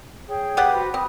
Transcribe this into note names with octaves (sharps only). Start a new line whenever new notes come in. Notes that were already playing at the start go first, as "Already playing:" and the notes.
G#4 C#5 G5
B3 G4 F#5
F#4 B4 C5
C4 B4 B5 D#6